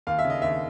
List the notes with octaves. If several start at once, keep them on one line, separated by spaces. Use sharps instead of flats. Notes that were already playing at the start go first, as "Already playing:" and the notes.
D#2 F5
E5
C#3
D#5
D#2 E5